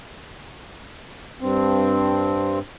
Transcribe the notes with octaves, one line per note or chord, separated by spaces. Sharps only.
G2 C4